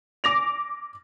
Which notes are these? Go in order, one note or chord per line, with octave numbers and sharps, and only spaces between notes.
D6 A#6 F7